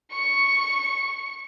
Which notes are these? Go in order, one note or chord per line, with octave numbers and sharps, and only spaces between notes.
C#6 C#7